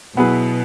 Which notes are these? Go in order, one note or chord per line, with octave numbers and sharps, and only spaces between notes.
B2 F#3 B3 E4 G#4 B4